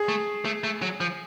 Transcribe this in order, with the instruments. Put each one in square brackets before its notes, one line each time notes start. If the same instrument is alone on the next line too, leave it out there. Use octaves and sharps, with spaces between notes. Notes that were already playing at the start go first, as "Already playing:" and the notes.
Already playing: [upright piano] G#4
[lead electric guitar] A3
A3
A3
F#3
F3